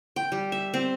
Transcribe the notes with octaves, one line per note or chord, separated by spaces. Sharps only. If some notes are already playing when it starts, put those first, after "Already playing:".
G5
G3
E5
C4